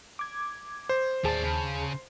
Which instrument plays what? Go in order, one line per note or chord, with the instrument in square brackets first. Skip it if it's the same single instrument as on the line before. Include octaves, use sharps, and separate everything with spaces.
[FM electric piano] D6 G#6
[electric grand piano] C5
[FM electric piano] D#2 G#4 A5 [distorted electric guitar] A2 D5
[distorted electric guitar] C#3